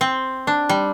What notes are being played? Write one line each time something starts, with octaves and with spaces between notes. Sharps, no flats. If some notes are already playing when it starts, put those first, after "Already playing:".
C4
D4
G3